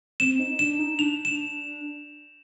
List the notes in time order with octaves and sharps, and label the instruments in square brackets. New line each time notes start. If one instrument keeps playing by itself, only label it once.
[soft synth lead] C4 [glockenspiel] E7
[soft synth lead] D#4
D#4
[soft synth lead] D4 [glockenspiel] E7
[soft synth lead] D#4
[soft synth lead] D4 [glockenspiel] F7
[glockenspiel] E7